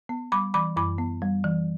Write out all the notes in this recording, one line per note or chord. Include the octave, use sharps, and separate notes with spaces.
B3
G3 B5 D6
E3 B5 D6
F#2 B5 D6
B3
G3
E3